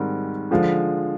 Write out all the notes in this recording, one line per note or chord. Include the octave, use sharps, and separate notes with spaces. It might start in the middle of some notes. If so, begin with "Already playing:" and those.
Already playing: G#2 D#3 G3 C4
D3 F3 G#3